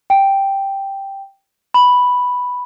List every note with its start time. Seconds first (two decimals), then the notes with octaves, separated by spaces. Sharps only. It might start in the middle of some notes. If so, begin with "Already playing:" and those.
0.10 G5
1.74 B5